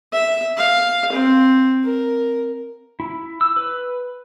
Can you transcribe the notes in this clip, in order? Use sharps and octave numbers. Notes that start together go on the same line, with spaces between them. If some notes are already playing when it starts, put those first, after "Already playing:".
E5
F5
C4
A#4
E4
E6
B4